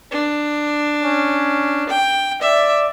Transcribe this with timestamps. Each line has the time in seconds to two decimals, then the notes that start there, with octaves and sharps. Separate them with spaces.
0.11 D4
1.03 C#4
1.89 G5
2.41 D5 E5